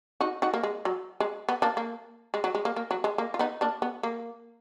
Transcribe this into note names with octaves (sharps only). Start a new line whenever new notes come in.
D#4 F#4
D#4 F#4
A#3
G#3
F#3
G#3
B3
A#3 D4
A#3
G#3
F#3
G#3
A#3
A#3
F#3
G#3
A#3
F4
B3 D#4
A#3 D4
B3
A#3